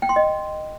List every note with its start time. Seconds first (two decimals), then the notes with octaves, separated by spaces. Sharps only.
0.02 G5
0.09 C6
0.16 D#5